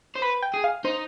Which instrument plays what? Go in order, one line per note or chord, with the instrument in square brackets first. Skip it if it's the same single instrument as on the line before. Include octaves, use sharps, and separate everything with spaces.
[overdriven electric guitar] C5
[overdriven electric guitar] B4 [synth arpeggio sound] B5
[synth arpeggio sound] G5
[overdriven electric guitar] G#4
[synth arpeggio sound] F5
[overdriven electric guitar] D#4 [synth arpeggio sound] C5